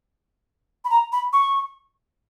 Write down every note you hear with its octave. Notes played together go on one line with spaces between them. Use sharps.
B5
A#5
B5
C#6